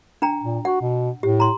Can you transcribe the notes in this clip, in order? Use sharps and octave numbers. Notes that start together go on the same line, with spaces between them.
D4 G5 A#5
A#2
F#4 F#5
B2
A2 G4
A#5 C6